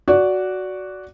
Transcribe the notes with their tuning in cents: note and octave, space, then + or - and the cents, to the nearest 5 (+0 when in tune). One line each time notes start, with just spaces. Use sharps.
F#4 +0 D5 -15